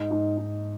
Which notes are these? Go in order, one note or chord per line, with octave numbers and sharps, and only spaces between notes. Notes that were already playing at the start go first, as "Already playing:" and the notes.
Already playing: G#2 D#4
G#2
G#2